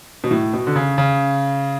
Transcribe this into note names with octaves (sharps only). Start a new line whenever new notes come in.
B2
A2
B2
D3
C#3
C#3